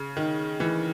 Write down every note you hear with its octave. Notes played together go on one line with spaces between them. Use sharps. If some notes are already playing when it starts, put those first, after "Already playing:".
Already playing: C#3
D#3
E3